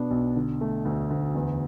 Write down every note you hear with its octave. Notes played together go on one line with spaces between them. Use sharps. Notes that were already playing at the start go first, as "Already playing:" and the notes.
Already playing: B2 B3 D4
B1
D3
A3
D2
D2
E2